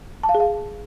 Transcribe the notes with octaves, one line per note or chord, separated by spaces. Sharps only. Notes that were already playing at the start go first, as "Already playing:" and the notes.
A5
F5
G#4
F5